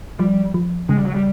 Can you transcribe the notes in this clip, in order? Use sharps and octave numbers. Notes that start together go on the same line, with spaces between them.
F3 G3
F3
C#3 G#3
G3
F#3
G3